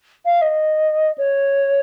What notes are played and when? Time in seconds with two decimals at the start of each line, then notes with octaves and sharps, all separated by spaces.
0.25 F5
0.41 D#5
1.18 C#5